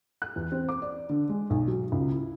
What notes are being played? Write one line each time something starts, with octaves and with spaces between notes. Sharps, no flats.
F#6
E2
C4
D6
D5
D3
G#3
B1
F#3
C#2
E4